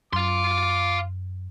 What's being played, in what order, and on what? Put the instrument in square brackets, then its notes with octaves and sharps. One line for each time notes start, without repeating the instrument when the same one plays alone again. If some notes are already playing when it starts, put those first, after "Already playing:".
[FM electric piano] F#2 [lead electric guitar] F5 C6 [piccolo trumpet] D6